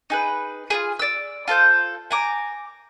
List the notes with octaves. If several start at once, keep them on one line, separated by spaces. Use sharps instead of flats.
D#4 G#4 B4
F4 G#4
D5 E6
F4 A4 C5 G6
G#5 A#5 D6